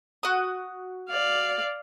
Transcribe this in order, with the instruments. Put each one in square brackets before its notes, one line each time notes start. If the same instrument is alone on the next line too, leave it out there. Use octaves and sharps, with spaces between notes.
[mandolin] F#4 D#6
[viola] D5 F5